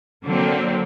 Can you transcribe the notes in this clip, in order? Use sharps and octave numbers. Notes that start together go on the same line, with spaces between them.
D3 F#3 A#3 C4